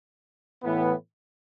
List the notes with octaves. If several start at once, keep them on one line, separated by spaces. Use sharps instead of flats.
A2 E3 B3